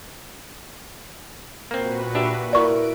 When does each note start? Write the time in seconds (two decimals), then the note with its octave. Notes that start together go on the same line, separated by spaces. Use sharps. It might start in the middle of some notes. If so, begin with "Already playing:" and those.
1.71 A#2 A#3 C4 F#4 B4
2.15 D4 G4 E5
2.53 E4 A#4 D5 C#6 D7